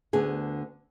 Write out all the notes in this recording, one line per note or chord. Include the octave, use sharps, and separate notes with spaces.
D2 D3 B3 G#4